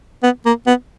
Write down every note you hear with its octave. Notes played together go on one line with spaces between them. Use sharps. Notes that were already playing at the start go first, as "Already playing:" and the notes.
B3
A#3
B3